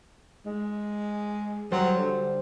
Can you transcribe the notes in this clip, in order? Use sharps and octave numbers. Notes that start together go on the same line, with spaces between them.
G#3
F#3 G3 C5
D3